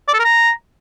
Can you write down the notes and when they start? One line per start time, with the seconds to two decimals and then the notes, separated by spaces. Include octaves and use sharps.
0.09 D5
0.14 A4
0.19 A#4
0.25 A#5